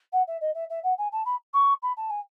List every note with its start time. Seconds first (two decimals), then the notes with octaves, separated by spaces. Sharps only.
0.12 F#5
0.27 E5
0.41 D#5
0.54 E5
0.70 E5
0.83 F#5
0.98 G#5
1.12 A5
1.25 B5
1.53 C#6
1.82 B5
1.97 A5
2.10 G#5